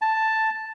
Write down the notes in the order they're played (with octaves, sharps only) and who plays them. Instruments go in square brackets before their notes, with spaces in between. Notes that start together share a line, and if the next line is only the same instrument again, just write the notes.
[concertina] A5